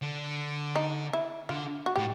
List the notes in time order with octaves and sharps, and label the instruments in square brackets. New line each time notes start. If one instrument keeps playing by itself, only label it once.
[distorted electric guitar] D3
[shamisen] D#4
E4
[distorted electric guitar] D3 [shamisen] F4
[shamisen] F#4
[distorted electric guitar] A2 [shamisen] G4